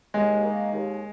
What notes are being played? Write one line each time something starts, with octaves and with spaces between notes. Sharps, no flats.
D#2 G#3
D#3 A#3 D#4
D#2